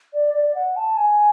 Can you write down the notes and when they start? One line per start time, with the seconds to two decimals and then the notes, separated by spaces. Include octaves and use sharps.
0.13 D5
0.34 D5
0.55 F#5
0.76 A5
0.97 G#5